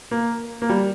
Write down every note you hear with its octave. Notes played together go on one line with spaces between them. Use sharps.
A#3
A#3
G3